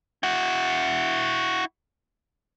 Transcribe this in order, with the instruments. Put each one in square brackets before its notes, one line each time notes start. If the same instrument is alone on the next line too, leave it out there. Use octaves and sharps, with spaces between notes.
[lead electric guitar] E4 F#4